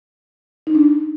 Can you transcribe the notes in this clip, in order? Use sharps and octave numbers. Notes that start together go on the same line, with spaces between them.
D#4
D4